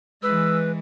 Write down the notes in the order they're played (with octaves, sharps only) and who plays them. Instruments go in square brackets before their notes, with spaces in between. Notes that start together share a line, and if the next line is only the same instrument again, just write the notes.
[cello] E3 G#3 [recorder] B4 [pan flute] E6